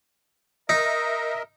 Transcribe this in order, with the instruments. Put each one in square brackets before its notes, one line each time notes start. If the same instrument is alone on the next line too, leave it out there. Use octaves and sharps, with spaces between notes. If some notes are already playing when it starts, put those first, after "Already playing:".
[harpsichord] D#4 [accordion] A#4 D#5 E5